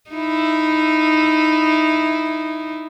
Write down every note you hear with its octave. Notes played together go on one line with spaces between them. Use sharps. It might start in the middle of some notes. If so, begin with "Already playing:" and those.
D#4 E4